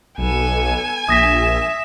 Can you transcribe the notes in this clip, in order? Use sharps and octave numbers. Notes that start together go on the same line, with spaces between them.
B1 B3 A4 G#5
A#1 E5 D#6 A#6 B6